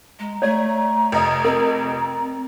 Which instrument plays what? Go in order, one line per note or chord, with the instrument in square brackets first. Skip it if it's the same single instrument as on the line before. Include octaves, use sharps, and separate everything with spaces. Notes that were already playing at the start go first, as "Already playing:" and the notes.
[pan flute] G#3 [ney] A#5
[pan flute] A3 [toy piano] C#5 D5
[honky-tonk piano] F1 D#5 D#6
[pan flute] C4 [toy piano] A#4